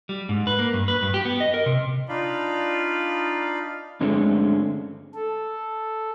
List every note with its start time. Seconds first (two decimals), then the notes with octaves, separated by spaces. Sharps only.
0.09 G3
0.29 G#2
0.47 B4
0.59 A#3
0.74 G2
0.88 B4
1.03 G2
1.14 G4
1.25 B3
1.40 D#5
1.54 A#4
1.66 C3
2.09 D4 D#4 F4 D5 F5 B5
4.01 G2 D3 G#3 A3 C4 C#4
5.14 A4